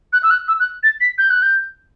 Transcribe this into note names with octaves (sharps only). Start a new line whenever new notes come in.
F#6
E6
F#6
E6
F#6
A6
B6
G6
F#6
G6